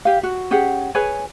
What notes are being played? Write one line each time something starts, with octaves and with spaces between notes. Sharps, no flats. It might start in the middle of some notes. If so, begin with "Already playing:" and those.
G4 F5
F#4
C#4 G4 G#4 F#5
G#4 B4 C#5 G#5